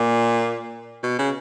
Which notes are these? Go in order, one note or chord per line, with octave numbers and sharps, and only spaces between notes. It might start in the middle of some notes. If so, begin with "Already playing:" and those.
Already playing: A#2
B2
C#3